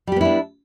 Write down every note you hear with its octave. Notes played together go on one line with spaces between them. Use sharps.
G3 B3 D4 E4 G4